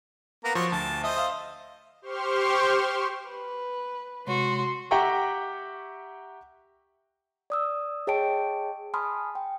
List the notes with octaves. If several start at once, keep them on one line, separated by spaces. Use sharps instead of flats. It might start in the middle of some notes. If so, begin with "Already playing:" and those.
A#3 B3 A#5
F3 F#3 C6 C#6
D2 A5
C5 D#5 E5
E5 F5
G4 C5 C6 C#6 F6
B4
C3 G#3 F#4 C#5 C6
G4 E5 F#5 G5 A#5 C#6
D5 D#6 E6
G#4 C#5 D#5 G5 A5 D7
G#5 A5 B5 C6 D#6 F6
G5